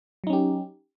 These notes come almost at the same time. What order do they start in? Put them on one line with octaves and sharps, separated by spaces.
F#3 D#4 C#4 G4